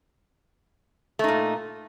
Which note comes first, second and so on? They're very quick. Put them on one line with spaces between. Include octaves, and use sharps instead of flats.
A3 D#4 A#2